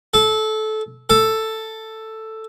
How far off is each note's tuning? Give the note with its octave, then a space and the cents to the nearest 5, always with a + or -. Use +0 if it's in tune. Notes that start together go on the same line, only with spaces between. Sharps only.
A4 -20
A4 +5